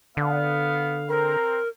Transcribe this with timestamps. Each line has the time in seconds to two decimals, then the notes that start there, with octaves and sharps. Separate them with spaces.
0.17 D3 B3 F5
1.09 C4 A#4 A#5